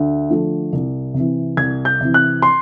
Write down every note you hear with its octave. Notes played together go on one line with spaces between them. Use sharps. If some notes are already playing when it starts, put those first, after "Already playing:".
Already playing: D2
D3 F3 A3
C2
C3
E3
C2 G#6
G6
C3 E3
F#6
C6